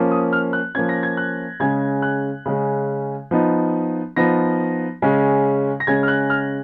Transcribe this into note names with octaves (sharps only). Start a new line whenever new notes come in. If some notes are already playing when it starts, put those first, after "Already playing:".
Already playing: F3 A#3 C#4
D#6
F6
F#6
F3 A#3 C#4 G#6
A#6
G#6
F#6
C#3 G#3 C#4 G#6
F#6
C#3 G#3 C#4
F3 B3 D#4
F3 B3 D#4 A#6
C#3 G#3 C#4
A#6
C#3 G#3 C#4 G#6
F6
F#6
F6